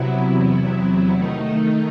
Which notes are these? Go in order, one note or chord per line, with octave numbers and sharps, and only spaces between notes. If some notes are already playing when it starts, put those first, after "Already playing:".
Already playing: C3 F#3 B3 E4
E2 C3 F#3 B3 E4
D#3 A3 D#4